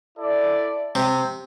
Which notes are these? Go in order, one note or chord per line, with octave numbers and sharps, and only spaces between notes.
E4 A4 D5
C3